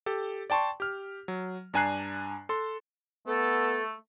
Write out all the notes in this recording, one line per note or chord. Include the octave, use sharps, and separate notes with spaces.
G4 A4
D5 G5 A5 C6 C#6
G4 F6
F#3
G2 D4 G#5 A#5 F#6 C7
A4 C6
A3 B3 A4